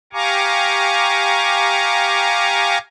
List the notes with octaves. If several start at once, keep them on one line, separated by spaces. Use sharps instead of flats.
G4 F5 G#5 A#5 C#6 D6